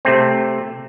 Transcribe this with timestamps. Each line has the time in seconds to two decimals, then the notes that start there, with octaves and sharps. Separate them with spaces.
0.05 C3 A3 C4